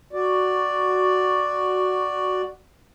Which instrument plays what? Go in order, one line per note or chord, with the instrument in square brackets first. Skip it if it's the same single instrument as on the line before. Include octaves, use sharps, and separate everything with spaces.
[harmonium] F#4 D5